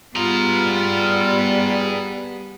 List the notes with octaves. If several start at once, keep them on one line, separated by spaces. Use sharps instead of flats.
G3 B3 F4 G#4 A#5